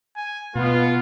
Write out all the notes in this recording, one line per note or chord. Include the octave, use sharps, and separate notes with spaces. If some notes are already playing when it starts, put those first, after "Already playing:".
G#5
B2 B3 F4